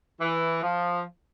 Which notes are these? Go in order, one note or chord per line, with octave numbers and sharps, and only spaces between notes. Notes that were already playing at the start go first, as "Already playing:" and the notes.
E3
F3